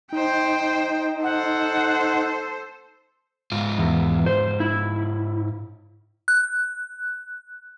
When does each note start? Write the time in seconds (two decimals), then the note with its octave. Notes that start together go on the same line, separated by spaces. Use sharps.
0.12 D#4 C5 G5
1.23 A4 C5 F#5
3.52 G#2 F4
3.78 E2
4.26 C5
4.60 E4
6.28 F#6